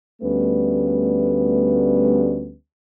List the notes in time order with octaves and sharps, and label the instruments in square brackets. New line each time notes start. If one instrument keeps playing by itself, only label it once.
[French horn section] D2 G3 A3 B3 C#4 B4